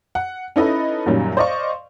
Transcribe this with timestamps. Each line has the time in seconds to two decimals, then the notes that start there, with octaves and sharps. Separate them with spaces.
0.15 F#5
0.56 C#4 D#4 E4 A4 B4 D#5
1.06 F#2 A#2 D#3 F#3 G3
1.37 C5 D5 D#5 F5 C#6